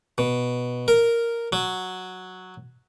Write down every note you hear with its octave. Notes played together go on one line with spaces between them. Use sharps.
B2
A#4
F#3